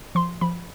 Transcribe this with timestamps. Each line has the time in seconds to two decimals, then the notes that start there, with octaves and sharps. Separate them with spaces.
0.15 F3 C6
0.41 F3 B5